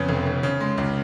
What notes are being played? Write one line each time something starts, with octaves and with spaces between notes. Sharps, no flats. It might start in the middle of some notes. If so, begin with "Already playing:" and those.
Already playing: F2 C#3 B3
F1
F1
C#3
G#3
C#2